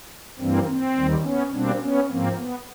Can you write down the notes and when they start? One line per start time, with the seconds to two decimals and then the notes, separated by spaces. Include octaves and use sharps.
0.39 G2 E3 G3 A#3 C4
0.67 C4
0.95 D#2 D#3 G3
1.23 B3 C#4
1.52 B2 G3 A#3 C4 D4
1.80 B3 C#4
2.08 G#2 F3 A#3 C4
2.35 B3